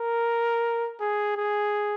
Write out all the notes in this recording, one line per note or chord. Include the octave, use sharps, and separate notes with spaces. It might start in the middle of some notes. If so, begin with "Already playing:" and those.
Already playing: A#4
G#4
G#4